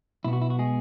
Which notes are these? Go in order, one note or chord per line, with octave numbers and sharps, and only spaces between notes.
B1 B2 B3 E4
F#4
E4
F#4
G#3 G#4